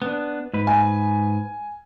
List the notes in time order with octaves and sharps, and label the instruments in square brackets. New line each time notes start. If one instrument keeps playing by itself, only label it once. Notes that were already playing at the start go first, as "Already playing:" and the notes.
[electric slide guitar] B3 D4
G#2 B4
[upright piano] G#5